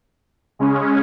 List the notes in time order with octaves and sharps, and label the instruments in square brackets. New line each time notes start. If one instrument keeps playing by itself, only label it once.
[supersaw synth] C#3 G#3 C#4